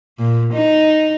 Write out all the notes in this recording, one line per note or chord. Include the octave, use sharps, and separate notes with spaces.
A#2
D#4